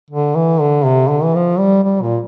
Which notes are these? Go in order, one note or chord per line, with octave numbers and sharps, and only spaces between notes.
D3
E3
D3
C3
D3
E3
F3
G3
G3
A#2